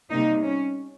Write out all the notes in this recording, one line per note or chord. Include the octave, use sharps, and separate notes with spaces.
C3 G3 A#3 D#4
C#4